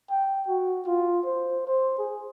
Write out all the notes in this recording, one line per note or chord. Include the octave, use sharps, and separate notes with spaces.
G5
F#4
F4
C5
C5
G#4